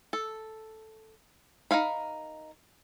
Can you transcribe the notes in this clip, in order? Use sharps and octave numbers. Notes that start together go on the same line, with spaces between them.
A4
D#4 A#4 F5 B5